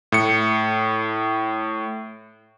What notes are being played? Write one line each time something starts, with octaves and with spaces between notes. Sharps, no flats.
A2 C#7